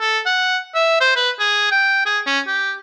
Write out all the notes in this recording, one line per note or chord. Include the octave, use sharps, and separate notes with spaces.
A4
F#5
E5
C5
B4
G#4
G5
G#4
C#4
G4